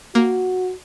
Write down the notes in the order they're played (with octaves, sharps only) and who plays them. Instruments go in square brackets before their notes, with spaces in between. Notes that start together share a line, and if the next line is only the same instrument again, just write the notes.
[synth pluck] A#3 [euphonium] F#4